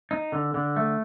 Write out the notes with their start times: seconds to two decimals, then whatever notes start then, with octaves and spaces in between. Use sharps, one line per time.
0.11 D#4
0.32 D3
0.54 D3
0.76 A3